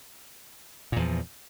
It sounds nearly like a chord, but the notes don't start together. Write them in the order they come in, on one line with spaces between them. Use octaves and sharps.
A#2 E2 F3